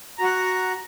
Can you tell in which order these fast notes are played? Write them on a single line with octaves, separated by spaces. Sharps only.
A#5 F#4 F#5